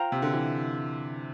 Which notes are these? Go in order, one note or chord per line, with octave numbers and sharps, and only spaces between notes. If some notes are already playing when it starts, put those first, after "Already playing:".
Already playing: F4 C5 G5 A#5
C3
D3
E3